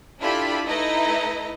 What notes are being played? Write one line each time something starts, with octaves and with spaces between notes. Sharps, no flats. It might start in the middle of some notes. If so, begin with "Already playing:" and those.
D4 E4 F4 G4 A4 B5
A3 D#4 E4 B4 D#5 A#5